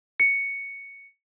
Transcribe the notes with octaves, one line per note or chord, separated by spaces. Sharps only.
C#7